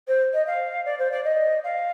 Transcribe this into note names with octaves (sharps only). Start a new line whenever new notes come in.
C5
D#5
F5
D5
C5
D5
D#5
F5